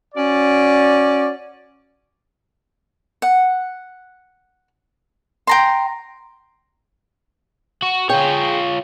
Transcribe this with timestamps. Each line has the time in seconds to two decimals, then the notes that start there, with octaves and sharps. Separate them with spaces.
0.15 C#4 F#4 D5
3.22 F#5
5.47 G5 A#5 C6
7.82 F#4
8.09 F4 G#4 C#5 G5